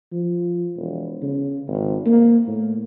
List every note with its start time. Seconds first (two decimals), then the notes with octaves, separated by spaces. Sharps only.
0.12 F3
0.76 E1
1.22 C#3
1.68 G#1
2.06 A#3
2.47 A2